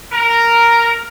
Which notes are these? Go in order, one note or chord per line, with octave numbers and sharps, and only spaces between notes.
A#4